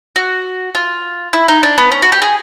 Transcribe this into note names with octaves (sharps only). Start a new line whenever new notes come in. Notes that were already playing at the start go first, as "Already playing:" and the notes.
F#4
F4
E4
D#4
D4
B3
C#4
F#4
G4
G#4